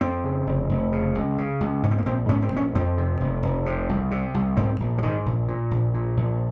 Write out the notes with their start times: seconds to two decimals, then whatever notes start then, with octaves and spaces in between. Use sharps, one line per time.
0.01 F2 C4
0.24 C#3
0.47 F1
0.69 F1
0.92 C#3
1.15 C#2
1.38 C#3
1.60 C#2
1.83 G#2 C#4
1.91 C4
1.98 A#3
2.06 A#1 C4
2.29 G#2 C#4
2.42 C4
2.52 A#1 C#4
2.75 F2 C4
2.98 C3
3.20 F1
3.43 F1
3.66 C3
3.89 C2
4.11 C3
4.34 C2
4.57 G#2 C4
4.80 A#1
4.98 F3
5.03 G#2 D#3
5.26 A#1
5.48 A#2
5.71 A#1
5.94 A#2
6.17 A#1